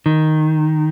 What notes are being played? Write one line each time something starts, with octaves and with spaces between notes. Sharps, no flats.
D#3